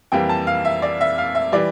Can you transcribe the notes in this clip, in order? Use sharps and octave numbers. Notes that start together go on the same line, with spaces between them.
F2 E3 G3 A#3 G5
A5
F5
E5
D5
E5
F5
E5
E3 G3 D5